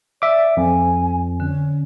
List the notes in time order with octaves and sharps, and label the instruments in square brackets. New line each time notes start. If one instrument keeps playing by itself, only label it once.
[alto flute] D5 [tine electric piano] E5 D6
[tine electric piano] F2 [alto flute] G#5
[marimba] D3 [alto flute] C#4